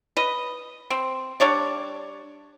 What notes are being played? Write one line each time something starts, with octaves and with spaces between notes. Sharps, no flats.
B4 D#5
C4
G3 D4 C#5 D5